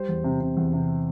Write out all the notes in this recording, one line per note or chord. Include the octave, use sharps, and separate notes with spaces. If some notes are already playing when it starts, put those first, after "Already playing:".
Already playing: G3 C5
E2
C3
C3
E2
C3